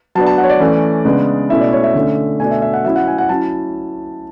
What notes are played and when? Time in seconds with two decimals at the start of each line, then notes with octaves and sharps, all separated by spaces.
0.15 F#3 B3 D4 A5
0.26 A5
0.38 F#5
0.44 C#5
0.49 D5
0.60 E3 A3 C#4
1.05 C#3 G#3 B3 D4
1.50 B2 A3 C#4 E4 E5
1.61 D5
1.73 C#5
1.83 E5
1.95 D3 A3 C#4
2.40 B2 A3 D4 G#5
2.51 E5
2.62 E5
2.73 F#5
2.84 F#3 C#4 E4 E5
2.96 F#5
3.07 G#5
3.18 F#5
3.29 F#3 C#4 E4 A5